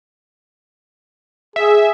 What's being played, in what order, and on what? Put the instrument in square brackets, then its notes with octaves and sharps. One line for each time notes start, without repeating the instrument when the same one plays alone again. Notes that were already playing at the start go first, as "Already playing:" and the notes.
[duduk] G#4 [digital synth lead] E5